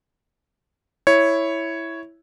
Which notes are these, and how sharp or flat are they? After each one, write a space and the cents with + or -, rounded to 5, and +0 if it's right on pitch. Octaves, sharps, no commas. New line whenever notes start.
E4 +0 C#5 +0